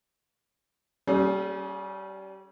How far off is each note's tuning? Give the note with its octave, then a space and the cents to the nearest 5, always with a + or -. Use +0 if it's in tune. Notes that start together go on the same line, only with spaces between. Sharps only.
G3 -25 C#4 +0 G#4 +30